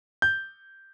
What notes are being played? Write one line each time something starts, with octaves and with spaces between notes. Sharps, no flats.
G6